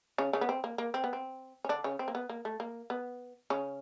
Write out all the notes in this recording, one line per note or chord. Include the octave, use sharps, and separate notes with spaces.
C#3 C#4
C#3 C#4
B3
C4
A#3
A#3
C4
B3
C4
C#4
D3 D4
C#3 C#4
C4
A#3
B3
A#3
A3
A#3
B3
C#3 C#4